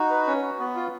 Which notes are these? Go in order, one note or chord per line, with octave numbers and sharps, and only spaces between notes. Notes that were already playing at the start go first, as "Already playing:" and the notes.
Already playing: D#4 F#4
B4
C#4
F#4
B3
F4